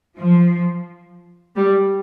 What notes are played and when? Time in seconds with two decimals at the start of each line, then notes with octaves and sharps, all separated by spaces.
0.17 F3
1.56 G3